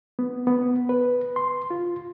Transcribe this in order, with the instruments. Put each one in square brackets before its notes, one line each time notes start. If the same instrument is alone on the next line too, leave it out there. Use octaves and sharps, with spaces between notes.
[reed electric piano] B3
B3
B4
C6
F4